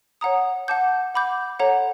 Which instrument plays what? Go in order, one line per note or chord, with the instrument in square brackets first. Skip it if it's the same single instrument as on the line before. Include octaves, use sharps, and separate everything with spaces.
[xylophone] C#5 F#5 A#5 D#6
F#5 A5 D6 G6
F#5 B5 D6 G6
A4 C#5 F#5 A#5